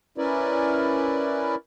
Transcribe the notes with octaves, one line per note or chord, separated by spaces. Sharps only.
C#4 E4 A#4 B4 D5